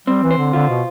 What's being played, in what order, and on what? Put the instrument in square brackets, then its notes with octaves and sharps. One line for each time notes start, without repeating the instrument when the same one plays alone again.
[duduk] G3 [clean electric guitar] C4
[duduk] E3
[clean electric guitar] C5
[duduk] D3
[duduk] D3 [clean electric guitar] F4
[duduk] B2